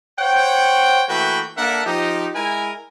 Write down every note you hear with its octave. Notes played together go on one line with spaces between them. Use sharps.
C5 C#5 F#5 G5
E3 A3 A#3 F#4 B4 G5
A#3 D4 A4 A#4 E5 F#5
F3 D#4 G4
G#3 E4 A#4 G#5